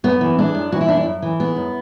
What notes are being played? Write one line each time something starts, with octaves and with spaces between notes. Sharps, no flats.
F#2 B3
E3
G#3 D4
F#2
E3 F#4
E4
F#2 D4
E4
F#2
E3
G#3 B3
F#2